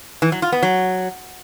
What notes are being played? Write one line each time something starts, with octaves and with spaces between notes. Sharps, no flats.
E3
F#3
F4
B3
F#3